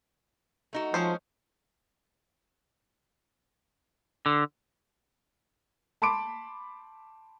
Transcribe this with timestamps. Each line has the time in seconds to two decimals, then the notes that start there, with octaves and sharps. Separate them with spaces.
0.73 A3 D#4 F#4
0.94 F3 G#3 C#4 C5
4.26 D3
6.02 A5 B5 C6 D6 D7